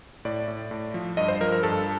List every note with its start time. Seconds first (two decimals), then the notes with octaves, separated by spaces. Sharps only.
0.25 A2 D5
0.48 A2
0.71 A2
0.94 F3
1.17 G2 D#5
1.28 C5
1.40 F3 A#4
1.52 A#4
1.63 G2 A4